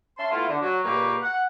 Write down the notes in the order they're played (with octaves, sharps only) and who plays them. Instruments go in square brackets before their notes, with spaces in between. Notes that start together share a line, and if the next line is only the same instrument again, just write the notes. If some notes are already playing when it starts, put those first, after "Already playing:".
[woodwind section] C#4 E5 A5 C6
A3 B3 E4 F4
D3
F#3
C#2 A#2 A#3 G4 B4 C#6
F#5